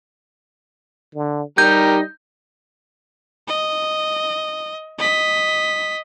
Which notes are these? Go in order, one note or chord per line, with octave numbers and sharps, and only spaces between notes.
D3
G3 D#4 G4 A#4 G6
D#5
D#5 B6